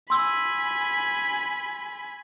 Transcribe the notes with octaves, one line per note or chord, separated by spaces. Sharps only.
G#5 B5 C6 E6